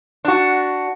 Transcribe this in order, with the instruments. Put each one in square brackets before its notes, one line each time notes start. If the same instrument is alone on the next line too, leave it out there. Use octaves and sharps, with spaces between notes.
[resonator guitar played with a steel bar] D4 F#4